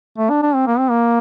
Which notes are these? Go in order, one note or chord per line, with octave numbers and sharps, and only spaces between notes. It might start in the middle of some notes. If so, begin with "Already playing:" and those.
A3
D4
D4
C4
A#3
C4
A#3